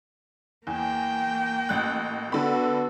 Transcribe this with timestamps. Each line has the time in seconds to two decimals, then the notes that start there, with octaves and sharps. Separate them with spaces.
0.67 E2 A#3 G5
1.69 A1 F#6
2.32 D3 B3 F#4 A4 B5